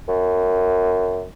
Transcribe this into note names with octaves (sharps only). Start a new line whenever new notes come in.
F#2